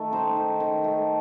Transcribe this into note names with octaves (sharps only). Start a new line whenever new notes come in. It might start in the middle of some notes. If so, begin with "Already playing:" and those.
Already playing: D#3 A3
D#4 C5
D#3
D#3
A3